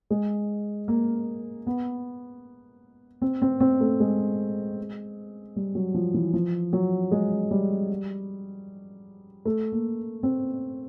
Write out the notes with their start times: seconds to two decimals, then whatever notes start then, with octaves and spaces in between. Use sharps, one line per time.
0.10 G#3
0.88 A#3
1.67 B3
3.22 C4
3.42 C4
3.61 C4
3.81 A3
4.00 G#3
5.56 G3
5.75 F#3
5.94 F3
6.14 E3
6.34 F3
6.73 F#3
7.11 G#3
7.51 G3
9.45 A3
9.72 A#3
10.23 C4